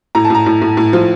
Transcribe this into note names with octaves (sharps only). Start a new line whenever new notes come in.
A2 A#5
A5
A2 A#5
A2
A2
A2
F3